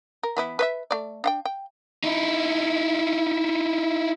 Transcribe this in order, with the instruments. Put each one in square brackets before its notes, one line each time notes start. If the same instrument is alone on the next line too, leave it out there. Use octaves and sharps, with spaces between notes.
[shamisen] A#4
E3 B3 E4
B4 C#5 E5
A3 D5
D4 F#5 G5
G5
[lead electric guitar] D#4 E4